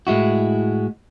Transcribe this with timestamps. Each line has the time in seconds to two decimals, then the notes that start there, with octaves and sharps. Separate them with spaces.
0.07 A2 G#3 E4 F#4